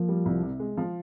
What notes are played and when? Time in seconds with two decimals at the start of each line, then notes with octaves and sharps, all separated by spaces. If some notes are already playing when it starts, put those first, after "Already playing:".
Already playing: F3 A#3
0.08 G3
0.25 C2
0.42 C3
0.59 G#3
0.77 F3